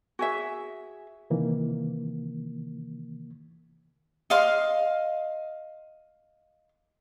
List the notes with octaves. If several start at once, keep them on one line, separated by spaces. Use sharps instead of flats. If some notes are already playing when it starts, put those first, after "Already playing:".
F#4 G#4 E5
C3 D#3 E3 A#3
D#5 F5 C6